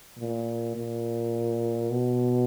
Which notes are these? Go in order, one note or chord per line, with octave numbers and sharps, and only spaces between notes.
A#2
A#2
B2